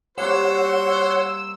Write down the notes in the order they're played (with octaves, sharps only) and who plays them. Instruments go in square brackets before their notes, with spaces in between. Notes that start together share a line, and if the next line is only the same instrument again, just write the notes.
[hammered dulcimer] G3 A#3 C4 [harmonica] F#4 C5 [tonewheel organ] C#5 F#5 [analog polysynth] E6